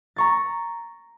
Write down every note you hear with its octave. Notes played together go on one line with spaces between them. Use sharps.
A#5 C#6 A6